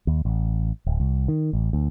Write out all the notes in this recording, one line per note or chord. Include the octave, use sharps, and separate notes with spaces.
D#2
A1
D1
C2
D#3
A1
D2